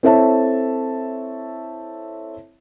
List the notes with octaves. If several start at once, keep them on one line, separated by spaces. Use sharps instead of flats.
C4 E4 A4 C#5 E5 A5